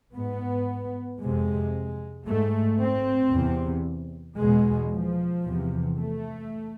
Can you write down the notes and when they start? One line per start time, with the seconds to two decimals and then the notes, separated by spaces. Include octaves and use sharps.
0.15 G#2 B3
1.20 F2 C3 G#3
2.27 G#2 A3
2.80 C4
3.33 E2 C3
4.38 E2 B2 G#3
4.91 F3
5.44 E2 C3
5.97 A3